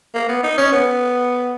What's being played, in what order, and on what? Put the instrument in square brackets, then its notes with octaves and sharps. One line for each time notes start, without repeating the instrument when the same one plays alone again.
[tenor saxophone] A#3
B3
D#4
C#4
B3